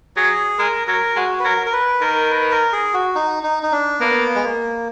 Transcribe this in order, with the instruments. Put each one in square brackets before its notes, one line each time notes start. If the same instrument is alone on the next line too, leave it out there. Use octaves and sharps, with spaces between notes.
[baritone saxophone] F#3 [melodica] G#4
[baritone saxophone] G#3 [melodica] A#4
[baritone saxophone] F#3 [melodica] A#4
[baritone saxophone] G#3 [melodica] F#4
[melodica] B4
[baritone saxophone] F#3 [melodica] A#4
[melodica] A#4
B4
[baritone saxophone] D#3 [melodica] A#4
[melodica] B4
A#4
G#4
F#4
D#4
D#4
D#4
D4
[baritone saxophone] A#3 [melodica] B3
[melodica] G#3
A#3